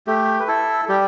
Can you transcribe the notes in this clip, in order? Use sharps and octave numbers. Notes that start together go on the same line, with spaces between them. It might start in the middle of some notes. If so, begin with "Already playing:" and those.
A3 G4
B4
E4 A4
G3 G4